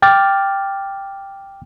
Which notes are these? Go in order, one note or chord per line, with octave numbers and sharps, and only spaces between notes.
G5 D6 F6 A6